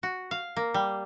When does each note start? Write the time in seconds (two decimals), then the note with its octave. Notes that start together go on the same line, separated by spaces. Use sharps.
0.03 F#4
0.31 F5
0.57 A#3
0.74 G3